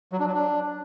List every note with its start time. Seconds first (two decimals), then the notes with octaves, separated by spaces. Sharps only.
0.12 F#3
0.20 D4
0.27 F#3
0.34 D4